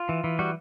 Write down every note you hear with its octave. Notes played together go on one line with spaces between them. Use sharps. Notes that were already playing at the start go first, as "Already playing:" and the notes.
Already playing: F4
E3
E3
G3 F#4